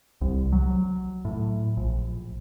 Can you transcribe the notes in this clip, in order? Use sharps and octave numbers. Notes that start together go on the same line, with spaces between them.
C2
F#3
A2
A#1